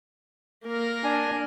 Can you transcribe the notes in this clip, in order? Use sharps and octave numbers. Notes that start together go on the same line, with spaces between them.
A#3 A#4
D4 G#5